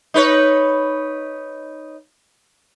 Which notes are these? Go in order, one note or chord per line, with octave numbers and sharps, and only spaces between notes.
D#4 B4 C#5